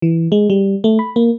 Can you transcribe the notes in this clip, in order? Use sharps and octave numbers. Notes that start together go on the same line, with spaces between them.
E3
G#3
G3
A3
B5
A#3